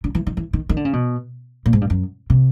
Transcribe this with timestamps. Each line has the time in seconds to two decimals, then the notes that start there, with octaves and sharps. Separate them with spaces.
0.04 D3
0.15 E3
0.27 D#3
0.37 E3
0.53 D#3
0.69 D#3
0.77 D3
0.85 C#3
0.93 B2
1.66 A#2
1.73 G#2
1.81 G2
1.90 F#2
2.30 C3